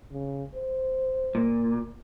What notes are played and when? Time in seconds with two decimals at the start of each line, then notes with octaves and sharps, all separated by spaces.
0.12 C#3
0.55 C5
1.35 A#2